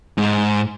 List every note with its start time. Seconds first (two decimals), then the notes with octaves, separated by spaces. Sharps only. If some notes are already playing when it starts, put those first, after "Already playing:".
0.18 G#2